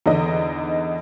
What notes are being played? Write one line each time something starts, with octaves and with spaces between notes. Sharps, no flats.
E2 D3 D#4 D#5